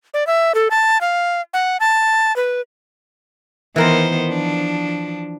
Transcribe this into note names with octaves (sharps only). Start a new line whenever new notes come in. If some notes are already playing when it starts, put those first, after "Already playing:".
D5
E5
A4
A5
F5
F#5
A5
B4
D#3 E3 B3 A#4 C5 C6
F3 D4